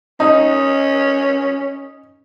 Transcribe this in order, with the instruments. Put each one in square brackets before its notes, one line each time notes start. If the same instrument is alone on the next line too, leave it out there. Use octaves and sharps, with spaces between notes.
[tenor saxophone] C#4 [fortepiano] D#4